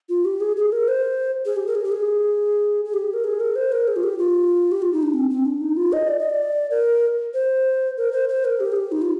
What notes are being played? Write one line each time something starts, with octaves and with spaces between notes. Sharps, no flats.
F4
G4
G#4
G#4
A#4
C5
G#4
G4
A#4
G#4
G4
G#4
G#4
G4
A#4
G#4
A#4
C5
A#4
G#4
F4
G4
F4
G4
F4
D#4
D4
C4
C4
D4
D#4
F4
D#5
D5
D#5
D5
A#4
C5
A#4
C5
C5
A#4
G4
G#4
G4
D#4
F4